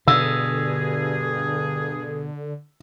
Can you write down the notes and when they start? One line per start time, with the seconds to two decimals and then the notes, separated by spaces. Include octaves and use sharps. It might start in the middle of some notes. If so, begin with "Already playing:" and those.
0.08 G2 B2 D3 G#4 E6